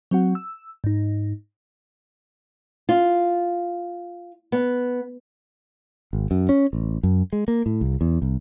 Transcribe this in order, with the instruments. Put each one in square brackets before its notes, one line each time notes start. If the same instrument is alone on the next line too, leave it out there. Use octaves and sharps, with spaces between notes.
[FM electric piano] F#3 C4 F#4 F#5
E6
G#2 D#4
[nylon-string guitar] F4
B3
[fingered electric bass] G#1
F#2
C#4
A1
F#2
G#3
A#3
A2
C2
E2
C2